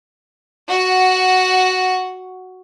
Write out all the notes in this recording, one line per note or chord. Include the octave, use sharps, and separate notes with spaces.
F#4 F#5